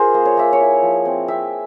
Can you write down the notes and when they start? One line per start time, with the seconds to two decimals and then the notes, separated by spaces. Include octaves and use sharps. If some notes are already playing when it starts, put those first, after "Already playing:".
Already playing: F4 G#4 A#4 C5
0.14 A#3
0.25 C#5
0.37 A#3 E5
0.53 C#5
0.60 E4
0.82 F3
1.05 C4
1.28 C4 E5